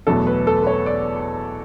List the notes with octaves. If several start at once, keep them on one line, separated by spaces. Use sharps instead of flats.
E2 B2 F#3 A3 A4
B4
A4
B4
C#5
D5